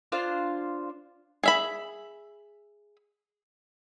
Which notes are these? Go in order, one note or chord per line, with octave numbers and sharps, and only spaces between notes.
D4 F4 C5 F5
G#4 E5 B5